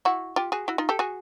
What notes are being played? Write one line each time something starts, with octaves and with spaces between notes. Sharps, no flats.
E4 F#4
F4 G4
F#4 G#4
E4 F#4
D#4 F4
G4 A4
F#4 G#4